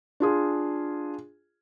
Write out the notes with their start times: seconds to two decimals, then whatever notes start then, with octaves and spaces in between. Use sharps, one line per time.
0.20 D4 F4 G#4